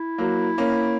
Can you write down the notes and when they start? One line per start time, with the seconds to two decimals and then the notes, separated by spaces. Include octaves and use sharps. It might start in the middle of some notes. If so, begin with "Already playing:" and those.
Already playing: E4
0.18 F#3 A#3
0.58 A#3 C#4